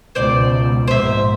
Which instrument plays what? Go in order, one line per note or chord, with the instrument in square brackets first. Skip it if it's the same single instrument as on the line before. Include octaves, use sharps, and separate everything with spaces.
[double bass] C#2 B2 [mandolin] C5 D5
[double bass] A#1 G#2 [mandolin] C5 E5